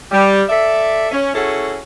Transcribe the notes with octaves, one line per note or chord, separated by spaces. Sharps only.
G3
A4 D5 E5
C#4
C#4 E4 F#4 G#4 A4